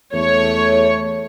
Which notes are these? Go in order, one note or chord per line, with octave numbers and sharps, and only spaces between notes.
E2 A3 C#5